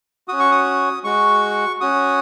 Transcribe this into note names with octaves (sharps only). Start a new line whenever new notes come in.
C#4 F#4 D#6
C#6
D#6
G#3 F#4 C#6
C#4 F#4 D#6